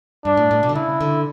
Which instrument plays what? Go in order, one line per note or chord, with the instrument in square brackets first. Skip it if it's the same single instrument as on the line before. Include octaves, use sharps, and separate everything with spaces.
[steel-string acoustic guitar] G2 [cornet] D4
[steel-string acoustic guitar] A2
A2
B2
D3
[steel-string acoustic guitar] C#3 [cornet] E4
[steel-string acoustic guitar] D3